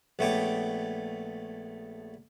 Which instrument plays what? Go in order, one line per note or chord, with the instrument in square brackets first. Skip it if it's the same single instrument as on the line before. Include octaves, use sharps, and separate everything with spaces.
[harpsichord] A#1 A3 B3 C#5 G5 D6